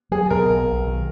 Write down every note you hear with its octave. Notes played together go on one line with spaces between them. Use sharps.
F#3 G#4
B2 A#4
B1
B1
D#3